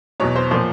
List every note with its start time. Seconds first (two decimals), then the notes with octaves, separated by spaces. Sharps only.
0.20 E2 B2 F#3 C#5
0.36 C5
0.51 A#2 F3 C5